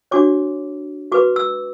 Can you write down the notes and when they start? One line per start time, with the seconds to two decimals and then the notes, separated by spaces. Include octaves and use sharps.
0.11 D4 F#4 C#5 D6
1.12 F#4 B4 D6
1.36 E6